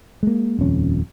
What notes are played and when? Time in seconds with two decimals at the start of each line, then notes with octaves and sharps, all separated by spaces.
0.23 G#3 A#3
0.59 D#1 F2 C#4